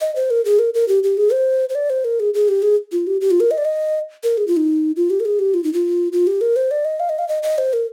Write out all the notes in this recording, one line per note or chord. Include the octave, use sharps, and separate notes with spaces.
D#5
C5
A#4
G#4
A#4
A#4
G4
G4
G#4
C5
C5
D5
C5
A#4
G#4
G#4
G4
G#4
F4
G4
G4
F4
A#4
D#5
D5
D#5
A#4
G#4
F4
D#4
F4
G4
A#4
G#4
G4
F4
D#4
F4
F4
G4
A#4
C5
D5
D#5
F5
D#5
F5
D#5
D#5
C5
A#4